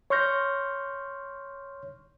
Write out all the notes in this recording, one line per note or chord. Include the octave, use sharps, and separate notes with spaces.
C#5 C6 C#6 F6 G6 A#6